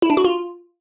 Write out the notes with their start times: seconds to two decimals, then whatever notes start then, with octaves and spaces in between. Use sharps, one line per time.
0.02 E4
0.10 D4
0.17 F#4
0.25 F4